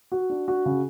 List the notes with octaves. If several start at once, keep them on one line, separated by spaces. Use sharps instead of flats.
F#4
D4
F#4
C#3